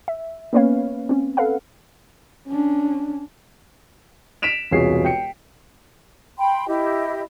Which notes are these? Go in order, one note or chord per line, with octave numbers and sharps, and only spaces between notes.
E5
A#3 B3 C#4 B4 C#5 F5
C4 C#4
A4 B4 F5 F#5
C#4 D4
B6 D7 E7 F7
E1 C2 F4 G#4 C#5 C7
G5 C#7
G5 B5 C6
E4 G4 D#5